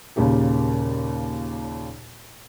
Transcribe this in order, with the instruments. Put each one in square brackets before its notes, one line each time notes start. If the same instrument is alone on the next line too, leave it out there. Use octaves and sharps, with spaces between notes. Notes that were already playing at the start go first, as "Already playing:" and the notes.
[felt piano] D#2 A#2 C#3 A#3 G4